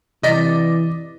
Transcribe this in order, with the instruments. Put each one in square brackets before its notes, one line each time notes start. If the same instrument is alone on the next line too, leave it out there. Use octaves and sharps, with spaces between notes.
[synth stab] C3 D5 [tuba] E3 [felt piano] D#5 A#6 B6